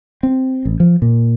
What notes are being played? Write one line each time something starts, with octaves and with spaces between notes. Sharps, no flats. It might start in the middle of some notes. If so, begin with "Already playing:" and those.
C4
A1
F3
A#2